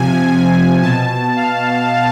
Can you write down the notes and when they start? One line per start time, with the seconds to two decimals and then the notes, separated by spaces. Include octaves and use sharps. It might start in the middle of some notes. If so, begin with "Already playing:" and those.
Already playing: C3 F3 G#5
0.82 B2 A5
1.37 F5